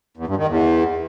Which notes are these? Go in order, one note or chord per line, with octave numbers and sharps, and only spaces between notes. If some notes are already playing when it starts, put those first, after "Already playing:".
E2
G2
D#3
E2